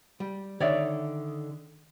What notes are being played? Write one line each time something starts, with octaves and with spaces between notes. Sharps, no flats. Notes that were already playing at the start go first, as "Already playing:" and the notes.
G3
D3 D#3 C#5 D5 E5